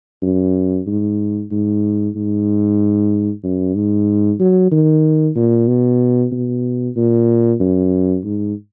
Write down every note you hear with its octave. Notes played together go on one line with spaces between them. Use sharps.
F#2
G#2
G#2
G#2
F#2
G#2
F#3
D#3
A#2
B2
B2
A#2
F#2
G#2